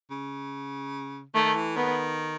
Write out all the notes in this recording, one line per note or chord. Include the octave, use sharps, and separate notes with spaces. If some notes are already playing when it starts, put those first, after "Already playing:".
C#3
D#3 A3
E3
D#3 B3